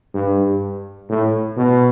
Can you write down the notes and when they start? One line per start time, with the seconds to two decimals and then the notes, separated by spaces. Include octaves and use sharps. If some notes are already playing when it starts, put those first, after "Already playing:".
0.14 G2
1.09 A2
1.57 B2